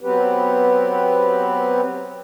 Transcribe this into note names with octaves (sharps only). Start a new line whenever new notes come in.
F#3 B3 C4 G4 B4